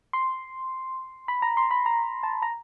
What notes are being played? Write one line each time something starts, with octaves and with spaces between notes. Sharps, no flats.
C6
B5
A#5
C6
B5
A#5
A5
A#5